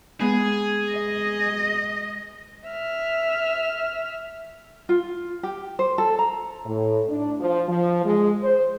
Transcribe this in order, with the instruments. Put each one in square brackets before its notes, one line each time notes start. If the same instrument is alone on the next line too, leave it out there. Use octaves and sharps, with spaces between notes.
[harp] G#3 B3 [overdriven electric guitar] G#4
[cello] D#5
[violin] E5 F6
[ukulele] F4
G4
C5
A4
A#5
[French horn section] A2
D4
F3
F3
G#3
C5